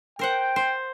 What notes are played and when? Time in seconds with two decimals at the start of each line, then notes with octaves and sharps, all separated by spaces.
0.19 A#4 C5 F#5 G5
0.56 C5